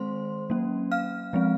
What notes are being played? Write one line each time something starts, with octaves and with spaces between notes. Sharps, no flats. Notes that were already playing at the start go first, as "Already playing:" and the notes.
Already playing: D#3 G#3 C4 C5 C6
F#3 A#3 C#4
F5 F6
F3 G#3 C4